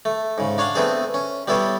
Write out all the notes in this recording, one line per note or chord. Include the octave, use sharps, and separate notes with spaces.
A3
G#2 C#3
D4 C#5 F5 F#5
A3 B3 C4 D4 G#4
C#4
G3 B3 E4 A4 C#5